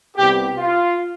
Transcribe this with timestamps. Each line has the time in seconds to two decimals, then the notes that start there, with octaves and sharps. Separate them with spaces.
0.16 C2 C3 G3 B3 G4
0.58 F4